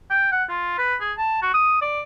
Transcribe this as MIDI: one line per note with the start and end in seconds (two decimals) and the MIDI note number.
0.10 0.29 79
0.32 0.44 78
0.49 0.77 65
0.78 0.95 71
1.00 1.13 68
1.18 1.39 81
1.42 1.52 66
1.54 1.80 87
1.82 2.02 74